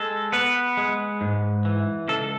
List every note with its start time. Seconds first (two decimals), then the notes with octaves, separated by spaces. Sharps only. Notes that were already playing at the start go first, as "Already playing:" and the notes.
Already playing: G#3 A4
0.32 B3 B4
0.77 G#3
1.21 G#2
1.65 E3
2.09 C#2 A4